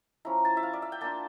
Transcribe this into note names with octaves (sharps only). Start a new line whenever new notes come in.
F3 C#4 E4 A#5
A5
E5
F5
D5
E5
G5
A#3 D4 F4 A5